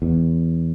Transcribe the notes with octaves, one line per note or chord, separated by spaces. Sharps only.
E2